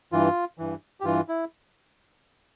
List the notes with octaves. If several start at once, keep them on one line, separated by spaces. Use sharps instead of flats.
G2 E3 F4
G2 E3
G4
G2 E3 F4
E4